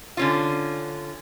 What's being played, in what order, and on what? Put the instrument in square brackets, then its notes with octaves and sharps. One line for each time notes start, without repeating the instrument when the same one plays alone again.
[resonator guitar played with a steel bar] D3 C#4 F4